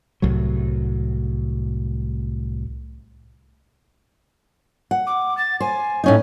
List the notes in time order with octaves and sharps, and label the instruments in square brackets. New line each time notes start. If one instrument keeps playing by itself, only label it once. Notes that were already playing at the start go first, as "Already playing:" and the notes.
[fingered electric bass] C2 A2 F#3
[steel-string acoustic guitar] F#5
[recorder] D6
A6
[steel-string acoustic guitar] C5 [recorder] G#5
[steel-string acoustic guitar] A2 C#4 D#4